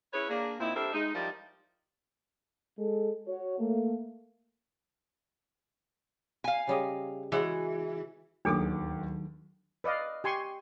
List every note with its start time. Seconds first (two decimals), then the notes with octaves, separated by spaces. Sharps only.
0.13 C#4 E4 G#4 B4 C#5
0.29 A#3 D4 G#4
0.59 A#2 C4 D#4 E4
0.75 G3 D4 A4 A#4 C5 E5
0.93 G#3 D#4
1.14 F3 G3 D#4 E4 A#4 D5
2.78 G#3 A4
3.27 F#4 C#5
3.59 A3 A#3
6.44 F5 G#5
6.67 C#3 G3 D#5
7.32 E3 G#3 F#4 F#5
8.45 D1 D#2 D#3 F#3 D4 G#4 A4 D6
9.84 B4 D5 D#5 F5
10.24 G4 G#5 C6 C#6